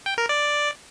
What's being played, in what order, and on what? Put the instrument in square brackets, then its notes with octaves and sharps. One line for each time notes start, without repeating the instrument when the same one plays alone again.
[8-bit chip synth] G5
A#4
D5